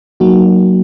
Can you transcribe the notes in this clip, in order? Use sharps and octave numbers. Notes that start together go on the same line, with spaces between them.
F#3 A#3 D#4 F#4